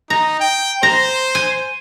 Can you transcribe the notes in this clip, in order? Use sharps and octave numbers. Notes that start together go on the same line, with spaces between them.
D#4 A#5
G5
C5 A#5
G#5